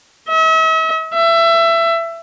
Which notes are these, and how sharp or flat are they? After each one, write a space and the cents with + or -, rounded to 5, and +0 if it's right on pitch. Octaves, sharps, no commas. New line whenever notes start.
E5 -45
E5 +20